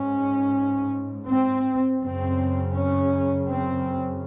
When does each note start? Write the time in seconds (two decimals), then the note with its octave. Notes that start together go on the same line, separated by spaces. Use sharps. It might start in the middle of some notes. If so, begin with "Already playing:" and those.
Already playing: G#2 C#4
1.28 C4
2.01 F#2 C#3 C4
2.74 C#4
3.47 C4